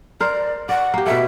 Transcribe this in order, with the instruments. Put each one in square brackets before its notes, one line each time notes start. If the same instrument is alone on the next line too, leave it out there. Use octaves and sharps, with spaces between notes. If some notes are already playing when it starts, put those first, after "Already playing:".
[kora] A#4 C5 [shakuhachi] D5
[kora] D5 [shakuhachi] F#5
[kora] A#3 G4
[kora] B2 A3 [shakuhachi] E5